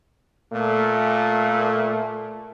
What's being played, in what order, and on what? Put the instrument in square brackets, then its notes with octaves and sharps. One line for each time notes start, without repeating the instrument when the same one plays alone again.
[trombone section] A#2 A3